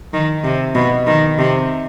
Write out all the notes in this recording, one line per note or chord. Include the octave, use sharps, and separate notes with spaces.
D#3
C3
B2
D#3
C3